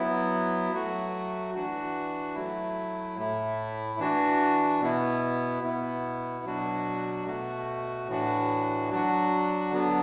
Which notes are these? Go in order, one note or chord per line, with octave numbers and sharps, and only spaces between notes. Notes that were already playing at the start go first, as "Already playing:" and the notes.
Already playing: F#3 B3 E4
F#3 A3 F#4
E3 D4 F#4
F#3 A3 E4
A2 A3 E4
E3 D4 F#4
B2 B3 E4
B2 B3 E4
B2 F#3 D4 F#4
B2 A3 F#4
A2 E3 D4 F#4
F#3 D4 F#4
D3 F#3 B3 D4